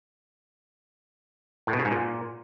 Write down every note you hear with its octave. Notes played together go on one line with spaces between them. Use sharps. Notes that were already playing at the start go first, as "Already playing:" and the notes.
A2
B2
C#3
G#2
A#2